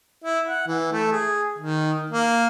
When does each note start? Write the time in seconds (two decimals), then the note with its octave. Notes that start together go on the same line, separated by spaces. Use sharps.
0.24 E4
0.49 F#5
0.67 E3
0.92 A3
1.12 G#4
1.59 D#3
2.10 A#3